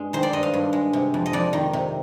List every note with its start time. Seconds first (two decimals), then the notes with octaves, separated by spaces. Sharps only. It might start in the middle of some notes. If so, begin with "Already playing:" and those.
Already playing: G2 G#3
0.13 D#3 C5
0.23 D5
0.33 G2 D#5
0.43 F5
0.54 G2
0.73 G#3
0.93 C3
1.14 F2
1.26 D#5
1.33 F2 D5
1.53 D#3
1.73 C3